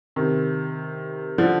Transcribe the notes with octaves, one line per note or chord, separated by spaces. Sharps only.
C3 D#3
D3 F3